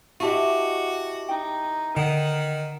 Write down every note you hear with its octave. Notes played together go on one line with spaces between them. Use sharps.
E4 F#4 G4 D#5 A5 C#6
D#4 G5
D3 D#3 F#5 A#5 E7